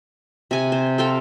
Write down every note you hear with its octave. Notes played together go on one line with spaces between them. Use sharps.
C3 G#5
C5
A4 C5 F5 G5